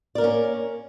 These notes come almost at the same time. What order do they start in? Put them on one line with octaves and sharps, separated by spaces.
D5 A#4 A#3 C#4